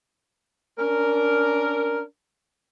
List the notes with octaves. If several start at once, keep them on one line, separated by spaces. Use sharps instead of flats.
C#4 D4 A#4